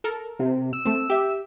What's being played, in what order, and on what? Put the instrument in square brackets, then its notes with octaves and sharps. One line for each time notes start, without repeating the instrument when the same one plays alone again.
[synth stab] A4 A#4
[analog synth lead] C3
E6
[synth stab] A3 C4
G4 E5